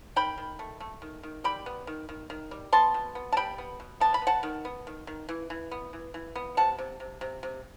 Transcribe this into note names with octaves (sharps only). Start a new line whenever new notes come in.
D#3 G5 B5
D#3
A3
A3
D#3
D#3
G3 G5 B5
B3
D#3
D#3
D#3
G3
B3 A5 C6
B2
B3
A5
G3 G5 B5
B3
B2
B3 A5
B5
B3
F#5 A5
D#3
B3
D#3
D#3
E3
E3
B3
E3
E3
B3
C3 F#5 A5
C3
C3
C3
C3